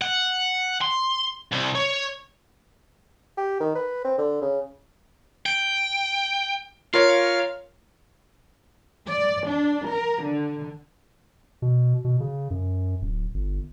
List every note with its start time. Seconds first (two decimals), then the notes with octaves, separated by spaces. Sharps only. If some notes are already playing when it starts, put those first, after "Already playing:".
0.02 F#5
0.81 C6
1.52 C2
1.75 C#5
3.37 G4
3.60 D#3
3.75 B4
4.05 C4
4.18 D3
4.41 C#3
5.46 G5
6.94 F4 A#4 C#5 F5
9.08 D5
9.49 D4
9.88 A#4
10.24 D3
11.62 B2
12.05 B2
12.20 C#3
12.50 F#2
13.01 D1
13.34 G1